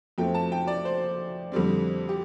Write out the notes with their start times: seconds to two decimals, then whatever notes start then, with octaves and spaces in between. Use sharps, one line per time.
0.18 F2 F3 A3 C4 G5
0.34 A5
0.52 G5
0.67 D5
0.85 C5
1.52 F2 D3 G3 C4
2.09 G4